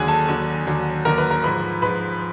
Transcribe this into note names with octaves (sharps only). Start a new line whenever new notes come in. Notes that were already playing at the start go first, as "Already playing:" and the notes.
Already playing: D#2 D3 F#3 G#4 G#5
A4 A5
D#2 D3 F#3
D#2 D3 F#3
D#2 D3 F#3 A#4 A#5
B4 B5
A#4 A#5
G#2 F3 B4 B5
G#2 F3 B4 B5